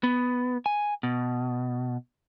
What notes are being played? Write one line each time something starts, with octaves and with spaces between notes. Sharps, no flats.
B3
G#5
B2